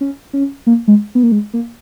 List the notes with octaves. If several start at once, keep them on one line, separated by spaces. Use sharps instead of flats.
C#4
C#4
A#3
G#3
B3
A#3
G#3
A#3